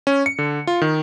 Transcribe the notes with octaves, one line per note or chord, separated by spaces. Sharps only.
C#4
C#7
D3
F4
D#3